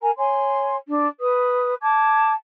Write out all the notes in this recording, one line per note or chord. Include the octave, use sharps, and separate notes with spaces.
A#4 G#5 A#5
C#5 G#5 C6
D4
B4 D#6
A5 D6 G#6